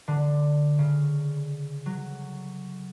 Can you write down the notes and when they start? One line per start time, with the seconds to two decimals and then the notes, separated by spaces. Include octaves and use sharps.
0.08 D3
0.79 C#3
1.86 F#3